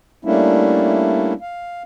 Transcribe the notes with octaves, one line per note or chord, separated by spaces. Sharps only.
G3 A3 A#3 C#4 D4 E4
F5